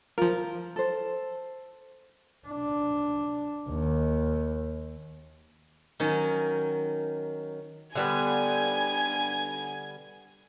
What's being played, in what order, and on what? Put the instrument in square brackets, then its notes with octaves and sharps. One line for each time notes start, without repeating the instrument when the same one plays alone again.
[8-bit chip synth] F3 A#4 [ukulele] F4
[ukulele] A4 C5
[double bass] D4
D#2
[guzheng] D#3 F#3 C#4
[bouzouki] D3 G3 B3 [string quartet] G#5 G#6